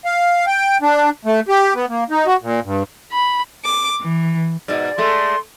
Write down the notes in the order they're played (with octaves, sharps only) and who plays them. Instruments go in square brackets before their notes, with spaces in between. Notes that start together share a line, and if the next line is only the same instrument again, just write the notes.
[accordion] F5
G5
D4
A3
G4
B3
A#3
D#4
F#4
A#2
G2
[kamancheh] B5
[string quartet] D6
E3
[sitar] G#2 B2 [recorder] D5
[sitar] G#3 A3 [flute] C6